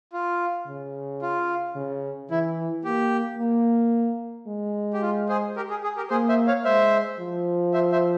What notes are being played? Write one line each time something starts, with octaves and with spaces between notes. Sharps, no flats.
F4
C#3
F4
C#3
E3 E4
A#3 G4
A#3
G#3
G4
F4
G#4 C5
G4 A#4
G#4
G#4
G4 A#4
A#3 G#4 C5
C5 E5
C#5 F5
G#3 C5 E5
F3
C5 E5
C5 E5